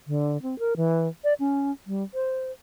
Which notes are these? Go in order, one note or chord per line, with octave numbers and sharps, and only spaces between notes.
D3
C4
A#4
E3
D5
C#4
G3
C5